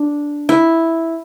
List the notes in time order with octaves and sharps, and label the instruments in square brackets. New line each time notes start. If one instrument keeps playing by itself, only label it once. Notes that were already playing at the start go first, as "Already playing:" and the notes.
Already playing: [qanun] D4
E4